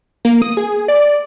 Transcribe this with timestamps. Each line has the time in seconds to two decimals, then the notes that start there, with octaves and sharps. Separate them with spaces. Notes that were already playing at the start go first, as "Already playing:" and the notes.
0.25 A#3
0.42 D#6
0.57 G#4
0.88 D5